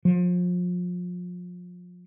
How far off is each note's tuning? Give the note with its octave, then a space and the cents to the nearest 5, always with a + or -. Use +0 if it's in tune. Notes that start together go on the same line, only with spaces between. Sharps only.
F3 +35